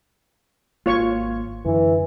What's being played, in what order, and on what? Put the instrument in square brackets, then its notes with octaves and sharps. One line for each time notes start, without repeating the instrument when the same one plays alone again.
[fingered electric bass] G#1 A#3 [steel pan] F4 C#5 C#6
[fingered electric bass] F#2 D3 [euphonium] E3